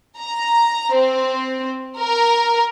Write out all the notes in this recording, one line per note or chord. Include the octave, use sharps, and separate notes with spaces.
A#5
C4
A#4